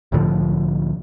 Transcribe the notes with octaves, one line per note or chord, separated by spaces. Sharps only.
C2 A2 D3 F3